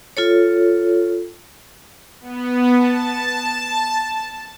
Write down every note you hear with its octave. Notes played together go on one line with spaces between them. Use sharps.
F4 A4 C#5
B3
A5